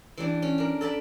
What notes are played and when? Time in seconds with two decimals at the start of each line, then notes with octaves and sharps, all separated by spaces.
0.18 E3 G3 D4
0.42 C#4
0.58 D4 A#4
0.81 A4 D5 A5 B5